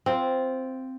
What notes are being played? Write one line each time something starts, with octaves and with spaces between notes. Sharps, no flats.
C4 F4